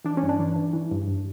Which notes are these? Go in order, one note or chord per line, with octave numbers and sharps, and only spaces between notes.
E3 D4
C#4
G2
D4
E3
E3
E3
G2
G2